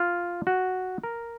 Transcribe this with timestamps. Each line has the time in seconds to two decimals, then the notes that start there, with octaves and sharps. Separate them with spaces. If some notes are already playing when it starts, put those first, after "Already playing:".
Already playing: F4
0.47 F#4
1.04 A#4